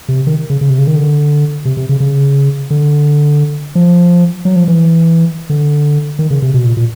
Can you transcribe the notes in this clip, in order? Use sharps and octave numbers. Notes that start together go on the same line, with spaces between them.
C3
D#3
C#3
C#3
C3
C#3
D#3
D3
C3
C3
C#3
C#3
D3
F3
F#3
F3
E3
D3
D#3
C#3
C3
B2
A#2
A#2